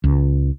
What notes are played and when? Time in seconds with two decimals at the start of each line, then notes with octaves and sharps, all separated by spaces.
0.04 C#2